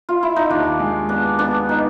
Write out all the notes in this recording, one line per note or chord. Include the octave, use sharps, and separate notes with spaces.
F4
E4
D#4
D#2 D4
G#3
B3 D4
B3 D4
B3 D#4